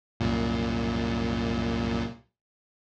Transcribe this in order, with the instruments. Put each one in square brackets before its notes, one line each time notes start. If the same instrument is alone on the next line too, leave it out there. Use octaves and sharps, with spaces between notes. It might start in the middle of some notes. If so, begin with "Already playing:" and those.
[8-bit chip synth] C2 F#2 A#2